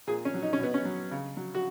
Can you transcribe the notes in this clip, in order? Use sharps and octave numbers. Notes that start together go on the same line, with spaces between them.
A#2 G#4
C#4
F#3
D#4
C#4
B2 B3
C#4
F#3
C#3
F#3
F#4